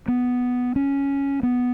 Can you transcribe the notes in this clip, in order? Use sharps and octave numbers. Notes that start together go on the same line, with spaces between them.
B3
C#4
B3